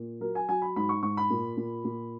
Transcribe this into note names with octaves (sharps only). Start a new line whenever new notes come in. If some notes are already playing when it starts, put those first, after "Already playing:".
Already playing: A#2
F#3 A#4
G#5
F#3 G#5
B5
G#2 B5
C#6
G#2 C#6
B5
A#2
A#2
A#2